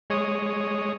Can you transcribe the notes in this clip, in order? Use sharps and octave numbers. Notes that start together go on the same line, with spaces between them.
G#3 C#5 D#6